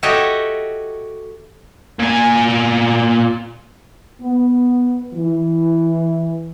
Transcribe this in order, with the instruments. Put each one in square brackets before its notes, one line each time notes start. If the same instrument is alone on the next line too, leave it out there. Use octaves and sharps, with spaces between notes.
[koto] F#4 G4 A4 C#5 D#5 E5
[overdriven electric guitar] A#2 G#5
[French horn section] B3
E3